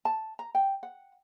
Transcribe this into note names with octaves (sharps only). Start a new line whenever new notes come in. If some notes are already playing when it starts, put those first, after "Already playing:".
A5
A#5
G5
F#5